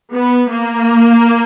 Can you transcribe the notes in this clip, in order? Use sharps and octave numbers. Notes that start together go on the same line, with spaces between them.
B3
A#3